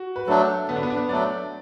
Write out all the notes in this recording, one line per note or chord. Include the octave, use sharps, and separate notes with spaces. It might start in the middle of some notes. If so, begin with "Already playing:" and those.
Already playing: F#4
B4
F#3 A3 D4 A4
D3 B3
D4
B3
D4
B3
F#3 A3 D4 D5